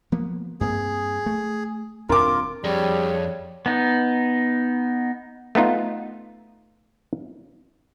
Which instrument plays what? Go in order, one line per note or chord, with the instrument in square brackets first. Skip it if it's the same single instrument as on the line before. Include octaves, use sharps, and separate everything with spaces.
[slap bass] F3 A#3 B3
[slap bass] G2 A#3 C4 [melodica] G#4
[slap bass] A3
[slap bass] D#1 C4 D4 [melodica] F4 [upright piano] A#4 D6
[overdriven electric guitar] F2 [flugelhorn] G3 [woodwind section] D4 G#4 C#5
[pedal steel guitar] B3 D#4
[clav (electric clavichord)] A3 B3 D#4 F4